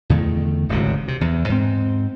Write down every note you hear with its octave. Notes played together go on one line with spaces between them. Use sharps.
E2 D3 D#3 A3
D1 G#1 C#2 C3
C3
E2
G#2 C4